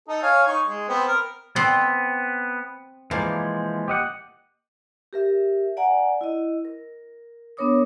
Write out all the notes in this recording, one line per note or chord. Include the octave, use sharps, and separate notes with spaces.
D#4 A4 D#5
C#5 F5 G#5
D#4 C#6
G#3
B3 C4
A#4
B3 C4
E3 F3 G#3 A#3
G4 D#5 F#5
G4 A#4 E5
D5 F#5 G#5 A#5
E4 D#5
A#4
B3 D4 A#4 C#5 D6 D#6